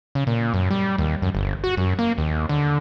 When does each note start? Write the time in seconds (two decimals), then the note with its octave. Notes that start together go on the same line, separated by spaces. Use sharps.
0.15 C#3
0.27 A#2
0.54 F#2
0.71 G3
0.98 D#2
1.22 F#2
1.35 G1
1.64 F#4
1.77 F#2
1.99 A#3
2.18 D#2
2.49 D3